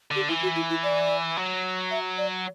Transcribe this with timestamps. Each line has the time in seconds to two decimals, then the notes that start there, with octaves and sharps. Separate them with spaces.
0.11 D3 G4
0.28 E3 E4
0.43 F#4
0.56 E4
0.70 E4
0.83 D5
1.37 F#3
1.91 E5
2.18 D5